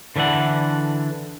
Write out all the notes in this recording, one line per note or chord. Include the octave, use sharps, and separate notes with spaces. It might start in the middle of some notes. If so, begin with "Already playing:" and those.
D3 E3 D4 E4 F#5